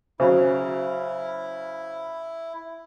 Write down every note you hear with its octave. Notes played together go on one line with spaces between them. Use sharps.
C#3 F#3 E4 C5